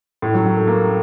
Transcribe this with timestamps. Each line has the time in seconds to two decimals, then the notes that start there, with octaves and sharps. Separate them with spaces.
0.22 A2
0.34 F#3
0.46 F#3
0.57 A3
0.68 A#3